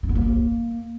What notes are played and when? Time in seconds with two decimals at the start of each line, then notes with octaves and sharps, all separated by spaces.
0.03 D4
0.09 B3
0.15 A#3